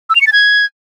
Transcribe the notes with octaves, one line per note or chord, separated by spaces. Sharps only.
E6
F7
C#7
A6
G#6